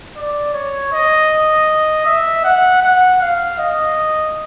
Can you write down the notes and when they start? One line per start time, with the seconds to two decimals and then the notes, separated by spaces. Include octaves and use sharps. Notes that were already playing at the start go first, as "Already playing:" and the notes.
0.16 D5
0.54 C#5
0.93 D#5
2.06 E5
2.44 F#5
2.82 F#5
3.21 F5
3.59 D#5